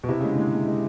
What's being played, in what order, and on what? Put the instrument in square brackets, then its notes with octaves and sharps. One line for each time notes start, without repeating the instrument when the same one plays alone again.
[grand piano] B2
[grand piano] C3 [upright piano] E4
[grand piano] C#3 [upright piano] G#3
[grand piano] D3
[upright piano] G#3
G#3
G#3